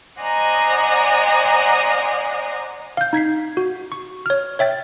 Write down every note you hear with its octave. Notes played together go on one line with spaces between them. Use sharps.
C5 D5 D#5 F#5 G#5 A#5
F5 G6
D#4 G#6 B6 C7
F#4
C#6
C#5 F6
C#5 E5 G5 A6